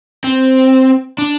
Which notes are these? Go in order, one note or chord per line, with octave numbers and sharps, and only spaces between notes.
C4
D4